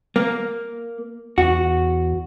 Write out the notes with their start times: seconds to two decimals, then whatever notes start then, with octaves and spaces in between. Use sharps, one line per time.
0.16 A#3
1.38 E2 F#4